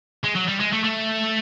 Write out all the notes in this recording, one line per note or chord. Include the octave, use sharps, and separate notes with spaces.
G#3
F#3
G3
G#3
A3
A3